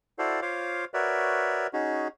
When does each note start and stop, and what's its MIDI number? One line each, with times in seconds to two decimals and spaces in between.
0.19 0.40 64
0.19 0.40 66
0.19 0.40 69
0.19 0.40 72
0.19 0.40 74
0.19 0.40 77
0.42 0.85 65
0.42 0.85 72
0.42 0.85 73
0.42 0.85 77
0.42 0.85 86
0.94 1.67 66
0.94 1.67 70
0.94 1.67 71
0.94 1.67 73
0.94 1.67 74
0.94 1.67 76
1.73 2.08 61
1.73 2.08 63
1.73 2.08 66
1.73 2.08 68